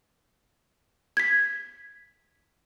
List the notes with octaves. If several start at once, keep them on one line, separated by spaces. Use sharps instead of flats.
G#6 B6